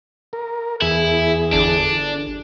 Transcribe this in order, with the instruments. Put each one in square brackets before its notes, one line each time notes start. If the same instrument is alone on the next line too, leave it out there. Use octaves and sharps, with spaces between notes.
[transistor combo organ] A#4
[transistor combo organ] E2 G#4 [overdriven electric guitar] E4
[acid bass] G1 [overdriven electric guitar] D4